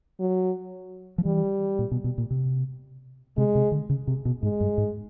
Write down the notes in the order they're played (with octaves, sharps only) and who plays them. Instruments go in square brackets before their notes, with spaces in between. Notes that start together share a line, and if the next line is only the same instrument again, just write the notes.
[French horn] F#3
[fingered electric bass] F3
[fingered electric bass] E3 [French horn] G3
[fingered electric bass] A#2
B2
B2
A#2
C3
[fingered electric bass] C3 [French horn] G#3
[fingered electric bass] C3
D3
C#3
C3
B2
[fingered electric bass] G#2 [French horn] G#3
[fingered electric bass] G2
G#2